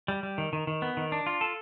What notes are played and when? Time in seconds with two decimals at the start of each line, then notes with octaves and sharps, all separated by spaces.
0.08 G3
0.23 G3
0.38 D#3
0.53 D#3
0.67 D#3
0.82 B3
0.97 D#3
1.12 D4
1.26 F4
1.41 A4